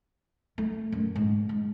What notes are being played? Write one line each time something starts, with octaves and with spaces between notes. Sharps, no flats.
A3
F#2
G#2
G#3